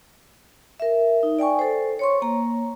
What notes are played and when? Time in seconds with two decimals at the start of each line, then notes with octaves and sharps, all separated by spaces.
0.80 A#4 E5
1.23 D#4
1.39 D5 G5 G#5 C#6
1.59 A4 C5
1.99 C#5 C6 C#6
2.22 A#3 A#5